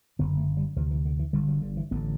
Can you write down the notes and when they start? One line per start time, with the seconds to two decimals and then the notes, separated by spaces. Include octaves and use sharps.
0.19 F#1 F#2 D3 B3
0.37 A3
0.57 G3
0.76 D2 C3 E3
0.91 E3
1.06 D3
1.19 E3
1.33 G1 G2 D3 G3
1.48 F#3
1.62 D3
1.77 E3
1.91 A1 D3 B3